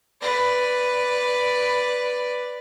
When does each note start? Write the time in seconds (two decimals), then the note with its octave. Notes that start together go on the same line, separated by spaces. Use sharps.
0.22 B4 D5